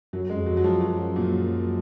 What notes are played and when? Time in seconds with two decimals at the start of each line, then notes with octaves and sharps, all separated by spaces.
0.13 F#2 F#3
0.30 G#3
0.35 F2
0.46 F#3
0.50 F2
0.57 F#2 F#3
0.64 F3
0.81 F#3
1.16 A#2